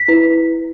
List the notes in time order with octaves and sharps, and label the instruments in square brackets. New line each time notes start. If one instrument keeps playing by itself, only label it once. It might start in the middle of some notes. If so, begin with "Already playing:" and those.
Already playing: [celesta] B6
E4 B4